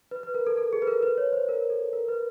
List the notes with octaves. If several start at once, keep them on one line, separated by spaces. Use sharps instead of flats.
B4
B4
A#4
A4
A4
G#4
B4
A#4
B4
C#5
C5
A#4
A4
A#4
B4